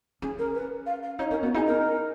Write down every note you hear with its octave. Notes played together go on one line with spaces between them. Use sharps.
C#4 G#4
A#4
B4
F5
F5
D#4 C#5
C#4 A#4
B3 F#4
D#4 G#4
A#4